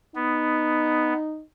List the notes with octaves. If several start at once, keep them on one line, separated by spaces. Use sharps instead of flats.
B3 D#4